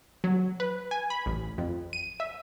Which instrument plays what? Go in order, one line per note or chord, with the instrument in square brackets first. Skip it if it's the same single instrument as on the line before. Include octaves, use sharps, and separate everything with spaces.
[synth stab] F#3
B4
G#5
B5
A1
F2
D#7
E5